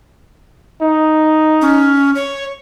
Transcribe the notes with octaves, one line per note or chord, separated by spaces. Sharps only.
D#4
C#4
C#5